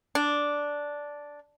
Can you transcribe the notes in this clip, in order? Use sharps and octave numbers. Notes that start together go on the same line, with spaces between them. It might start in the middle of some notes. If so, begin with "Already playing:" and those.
D4